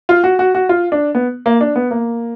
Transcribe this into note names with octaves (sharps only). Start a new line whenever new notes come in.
F4
F#4
F#4
F#4
F4
D4
B3
A#3
D4
B3
A#3